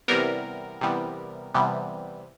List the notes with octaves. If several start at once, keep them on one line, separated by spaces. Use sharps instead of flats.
C3 E3 G3 B3 A#4
C3 E3 G3 B3
C3 E3 G3 B3